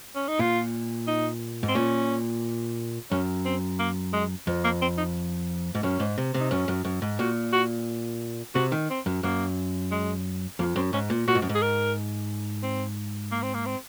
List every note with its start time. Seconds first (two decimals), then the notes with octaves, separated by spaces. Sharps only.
0.15 C#4
0.28 D#4
0.39 A#2 F4
1.07 D#4
1.63 G#2
1.68 C4
1.75 A#2 C#4
3.11 F#2 C#4
3.45 C4
3.79 A#3
4.13 G#3
4.47 F2
4.64 A#3
4.81 C4
4.98 D#4
5.75 G#2
5.83 F#2 C#4
6.00 G#2
6.18 C3
6.34 C3
6.40 D#4
6.51 F#2 C#4
6.68 F#2
6.85 F#2
7.02 G#2
7.19 A#2 F#4
7.53 F#4
8.55 C3 F#4
8.72 D#3
8.90 C4
9.06 F#2
9.23 F#2 A#3
9.91 G#3
10.59 F2 A#3
10.76 F#2 C4
10.93 G#2 C#4
11.10 A#2
11.28 A#2 F#4
11.35 G#2
11.42 F#2
11.49 G#2
11.55 G#4
11.62 A#4
12.63 C4
13.31 A#3
13.42 C4
13.54 A#3
13.66 C4